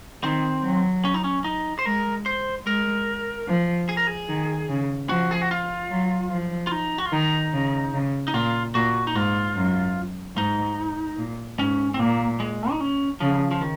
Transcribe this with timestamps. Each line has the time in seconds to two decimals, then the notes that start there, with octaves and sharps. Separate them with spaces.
0.23 D#3 C4
0.64 F#3
1.05 C#4
1.14 D#4
1.24 C#4
1.44 D#4
1.79 C5
1.85 G#3 A#4
2.26 C5
2.67 G#3 A#4
3.48 F3
3.89 G#4
3.97 A#4
4.07 G#4
4.29 D#3
4.69 C#3
5.09 F3 F#4
5.31 G#4
5.41 F#4
5.51 F4
5.91 F#3
6.32 F3
6.67 F4
6.72 D#4
6.98 F#4
7.06 F4
7.12 D#3 D#4
7.53 C#3
7.94 C#3
8.28 D#4
8.34 A#2 F4
8.75 A#2 F#4
9.07 D#4
9.15 G#2 F4
9.56 F#2
10.37 G#2 D#4
11.18 A#2
11.59 G#2 C#4
11.94 C4
11.99 A#2 A#3
12.40 G#3
12.70 D#4
12.80 C#4
13.20 C#3 F3
13.51 F3
13.61 D#3